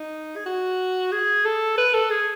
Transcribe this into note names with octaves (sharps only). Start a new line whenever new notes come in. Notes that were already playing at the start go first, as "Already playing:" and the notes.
Already playing: D#4
G#4
F#4
G#4
A4
B4
A4
G#4